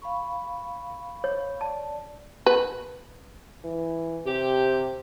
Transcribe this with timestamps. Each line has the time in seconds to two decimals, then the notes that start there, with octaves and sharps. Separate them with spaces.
0.02 F5 B5 C#6
1.24 C#5
1.61 D5 A5
2.46 B4
3.64 E3
4.26 C3 G4